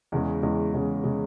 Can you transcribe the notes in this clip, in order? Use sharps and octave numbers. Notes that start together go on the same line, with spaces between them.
E2 C#3 G#3
E2 C#3 G#3
E2 C#3 G#3
C#3 G#3